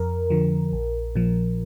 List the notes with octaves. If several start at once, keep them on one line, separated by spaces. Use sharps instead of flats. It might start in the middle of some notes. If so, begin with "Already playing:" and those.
Already playing: F2 A#4
D3 F3
A#1
A#2 F3